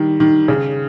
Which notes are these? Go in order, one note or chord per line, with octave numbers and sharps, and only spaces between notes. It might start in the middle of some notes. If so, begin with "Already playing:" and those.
Already playing: D#3 G3
D#3
C#3